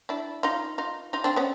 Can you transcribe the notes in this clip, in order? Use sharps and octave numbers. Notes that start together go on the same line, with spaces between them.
D4 E4
D#4 F4
D#4 F4
D#4 F4
C4 D4
B3 C#4